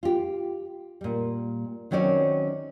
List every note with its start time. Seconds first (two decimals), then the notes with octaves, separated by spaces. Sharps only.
0.03 F4 G4
1.01 A#2 G3
1.91 D#3 F#3 C4 C#4 D5